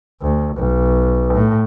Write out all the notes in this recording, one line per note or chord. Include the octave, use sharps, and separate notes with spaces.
D2
B1
A2